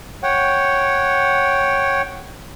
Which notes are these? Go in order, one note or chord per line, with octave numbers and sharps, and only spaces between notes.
C#5 F#5 G5